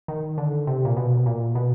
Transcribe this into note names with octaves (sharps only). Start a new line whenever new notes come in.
D#3
D3
C3
A#2
B2
A#2
B2